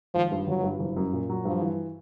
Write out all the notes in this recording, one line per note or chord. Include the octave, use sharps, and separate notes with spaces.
G#1 F3
G2
G1 F#3
G2
F#1
F#2
A#2
F#3
G2 F3
E3